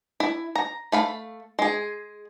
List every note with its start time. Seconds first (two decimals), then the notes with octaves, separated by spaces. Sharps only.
0.20 E4
0.55 A#5
0.92 A3 F5 B5
1.59 G#3 G#4